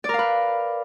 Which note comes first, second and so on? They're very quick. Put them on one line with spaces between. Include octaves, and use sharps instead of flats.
D5 A#4 F5 B4